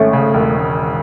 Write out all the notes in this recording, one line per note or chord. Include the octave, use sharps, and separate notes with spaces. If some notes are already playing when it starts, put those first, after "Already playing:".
Already playing: G#1 A3 C#4
C#3
E1